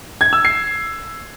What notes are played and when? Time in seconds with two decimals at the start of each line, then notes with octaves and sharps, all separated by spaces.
0.21 G#6
0.33 E6
0.45 C7